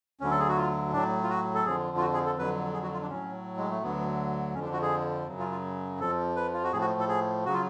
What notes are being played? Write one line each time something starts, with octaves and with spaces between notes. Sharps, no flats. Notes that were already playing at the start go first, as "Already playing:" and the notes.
D2 D3 F#3 C#4
A4
G#4
F#4
F4
A2 F#3 D4
F4
F#4
A4
F2 D3 F3 G#4
F4
F#4
G#4
A4
F2 D3 F#3 B4
G#4
F#4
F4
D4
A2 F#3 C#4
G#3
A3
D2 D3 F#3 B3
F2 D3 F3 C#4
D4
F#4
G#4
F#2 C#3 F#3
F4
F4
F2 F3 A4
B4
F4
F#4
A2 F3 G#4
F#4
A4
G#4
C#3 F#3 F#4
F4